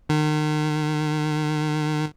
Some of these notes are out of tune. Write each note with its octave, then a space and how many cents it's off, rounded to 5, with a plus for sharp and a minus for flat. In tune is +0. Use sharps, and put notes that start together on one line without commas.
D#3 -35